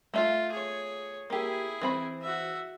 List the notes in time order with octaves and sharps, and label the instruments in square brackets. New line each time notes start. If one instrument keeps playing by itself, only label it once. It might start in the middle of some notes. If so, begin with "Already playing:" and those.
[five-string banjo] A3 E5 F5 [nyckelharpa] F4
[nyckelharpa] G#4 C#5
[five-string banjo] A#3 G4 [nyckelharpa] E4 G#4
[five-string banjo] E3 C4 B5
[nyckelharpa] F#4 E5